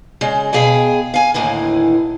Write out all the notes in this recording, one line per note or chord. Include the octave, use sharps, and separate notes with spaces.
C#3 G#3
B2 G#4 F5 G5 G#5
F5 G#5
D#2 A2 D3 E3